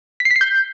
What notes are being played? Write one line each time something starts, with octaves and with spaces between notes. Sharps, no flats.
B6
C7
B6
C7
G6